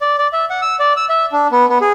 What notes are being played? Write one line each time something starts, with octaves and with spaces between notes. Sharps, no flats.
D5
D5
E5
F#5
E6
D5
E6
E5
D4
B3
B3
G#4